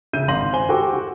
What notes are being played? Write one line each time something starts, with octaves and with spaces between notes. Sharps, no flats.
C#3 E5 G6 D#7
G#1 F5 C6 A#6 F#7
C5 G#5 G7
F#4 G4 A4 G5 C6 D6
F#4